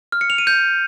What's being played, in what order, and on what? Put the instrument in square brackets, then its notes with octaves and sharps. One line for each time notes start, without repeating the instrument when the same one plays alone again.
[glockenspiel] F6
C#7
F7
D#7
G6